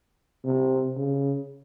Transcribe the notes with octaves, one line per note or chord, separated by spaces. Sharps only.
C3
C#3